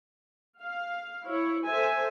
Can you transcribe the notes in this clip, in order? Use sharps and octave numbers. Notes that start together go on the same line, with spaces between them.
F5
E4 C#5
A4 C5 E5 G#5